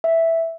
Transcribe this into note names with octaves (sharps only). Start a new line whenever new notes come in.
E5